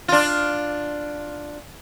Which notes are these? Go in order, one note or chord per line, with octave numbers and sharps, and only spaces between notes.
D4 F4